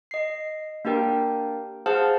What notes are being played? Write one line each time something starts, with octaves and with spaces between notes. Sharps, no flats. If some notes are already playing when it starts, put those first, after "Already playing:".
D#5 C7
A#3 D4 G4 A#4 G5
G#4 C5 F5 F#5 A5 F6